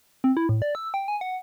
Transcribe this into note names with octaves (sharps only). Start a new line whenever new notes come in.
C4
E4
A2
D5
E6
G5
G#5
F#5